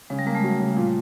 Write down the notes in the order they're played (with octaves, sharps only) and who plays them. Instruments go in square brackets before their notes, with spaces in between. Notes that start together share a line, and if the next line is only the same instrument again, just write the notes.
[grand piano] C#3 [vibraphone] G#3
[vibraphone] G3
[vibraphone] G#3 [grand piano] A#3
[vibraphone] A3
[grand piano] F#3
C#3
A#2